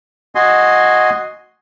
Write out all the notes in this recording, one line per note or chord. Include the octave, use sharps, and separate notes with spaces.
F#4 D#5 G#5 C6